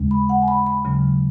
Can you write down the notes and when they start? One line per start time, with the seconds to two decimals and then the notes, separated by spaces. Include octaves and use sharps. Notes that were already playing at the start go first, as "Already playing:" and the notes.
Already playing: D#2 C#3 G#3
0.11 B5
0.29 F#5
0.42 G#5
0.48 B5
0.66 B5
0.85 D#2 C#3 F#3